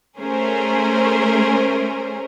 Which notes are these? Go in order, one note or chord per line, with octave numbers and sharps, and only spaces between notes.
A3 C#4 G#4 A#4 C5